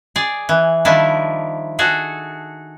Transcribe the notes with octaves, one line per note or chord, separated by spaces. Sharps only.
G#4 D5
E3
D#3 F3 G3 D4 E4
F#4 G#4 A4